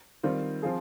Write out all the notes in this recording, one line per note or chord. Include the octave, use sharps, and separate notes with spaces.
D#3 G3 C4 F4
F3 C4 F4 G#4